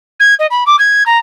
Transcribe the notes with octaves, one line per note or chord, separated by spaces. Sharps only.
G#6
D#5
B5
D6
G#6
A#5